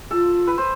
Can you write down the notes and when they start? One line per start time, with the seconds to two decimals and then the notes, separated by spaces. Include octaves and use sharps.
0.11 F4 A4
0.47 B4
0.58 C5